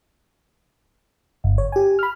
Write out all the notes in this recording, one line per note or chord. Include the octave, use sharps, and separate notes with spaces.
G1
C#5
G4 G#5
B5 F6